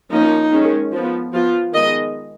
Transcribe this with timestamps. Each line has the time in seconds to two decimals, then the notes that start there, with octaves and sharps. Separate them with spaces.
0.11 F3 A#3 C#4 D#4
0.51 D#3 G#3 C#4
0.92 F3 B3
1.33 F3 B3 F4
1.74 D#3 G#3 B3 D#5